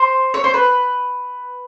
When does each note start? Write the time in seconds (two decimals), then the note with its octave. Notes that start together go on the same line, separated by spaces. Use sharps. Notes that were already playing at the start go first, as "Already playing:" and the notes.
Already playing: C5
0.34 C#5
0.44 C5
0.54 B4